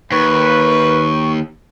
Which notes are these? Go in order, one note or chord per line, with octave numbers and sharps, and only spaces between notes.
D#2 A#3 B4 C#6